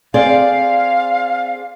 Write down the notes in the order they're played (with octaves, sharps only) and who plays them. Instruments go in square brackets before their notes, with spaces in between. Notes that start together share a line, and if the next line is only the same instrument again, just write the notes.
[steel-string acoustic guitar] C4 G#4 D5 [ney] F5